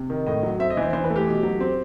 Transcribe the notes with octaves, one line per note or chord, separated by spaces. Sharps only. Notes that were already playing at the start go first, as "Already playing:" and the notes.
Already playing: C3
D#3
A2 D#5
F#3
C4 E5
D#5
E3 C5
E3 C5
B4
A3
G4
B2
F#3
C4